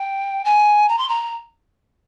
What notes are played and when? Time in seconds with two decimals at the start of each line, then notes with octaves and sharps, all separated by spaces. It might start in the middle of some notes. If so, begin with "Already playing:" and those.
Already playing: G5
0.45 G#5
0.89 A#5
0.98 C6
1.09 A#5